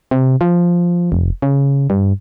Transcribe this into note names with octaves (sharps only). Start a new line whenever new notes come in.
C3
F3
F1
C#3
G2